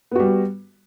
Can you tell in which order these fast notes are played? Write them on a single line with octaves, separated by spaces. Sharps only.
B3 F#4 G3